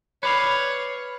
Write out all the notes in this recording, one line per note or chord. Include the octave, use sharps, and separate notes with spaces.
B4 C#5 D5 F5